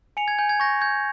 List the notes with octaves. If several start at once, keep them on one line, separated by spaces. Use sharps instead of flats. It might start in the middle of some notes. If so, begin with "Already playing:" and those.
G#5 C#7 F7
G#6
G#5 G6
G#6
C#6 G6 A#6
G6 G#6